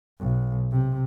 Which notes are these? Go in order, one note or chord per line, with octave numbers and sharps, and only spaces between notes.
B1
C3